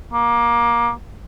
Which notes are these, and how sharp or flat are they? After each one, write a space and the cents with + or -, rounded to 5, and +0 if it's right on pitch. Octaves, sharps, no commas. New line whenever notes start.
A#3 +20